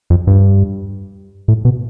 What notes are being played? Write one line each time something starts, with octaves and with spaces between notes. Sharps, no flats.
F2
G2
A2
B2